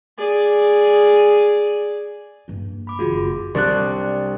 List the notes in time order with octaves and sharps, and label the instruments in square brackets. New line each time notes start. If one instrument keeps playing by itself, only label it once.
[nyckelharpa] G#4 D5
[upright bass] G2 A#3
[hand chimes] B5 D6
[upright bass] C#2 E3 [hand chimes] F4 F#4 G#4
[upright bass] F#1
[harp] C2 D4 F#6